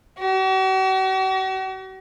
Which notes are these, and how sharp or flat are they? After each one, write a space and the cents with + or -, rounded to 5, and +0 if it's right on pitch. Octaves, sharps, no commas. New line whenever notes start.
F#4 +45